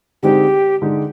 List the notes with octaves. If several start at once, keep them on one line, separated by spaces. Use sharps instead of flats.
D3 G#3 C4 D#4 G4
D3 G#3 D#4